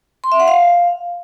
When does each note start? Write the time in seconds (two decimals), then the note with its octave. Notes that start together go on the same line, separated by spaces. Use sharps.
0.24 C6
0.32 E5
0.40 F#5
0.48 F5